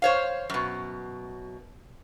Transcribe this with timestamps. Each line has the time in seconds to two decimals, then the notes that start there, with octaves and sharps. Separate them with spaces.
0.02 C5 C#5 F5
0.50 F#2 B2